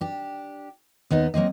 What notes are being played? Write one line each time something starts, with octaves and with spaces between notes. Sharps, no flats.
D4 G4
D#2 B3 D#4 D#5
F#3 A#3 C4 D#5